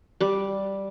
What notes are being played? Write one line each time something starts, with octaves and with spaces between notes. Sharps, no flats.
G3 D6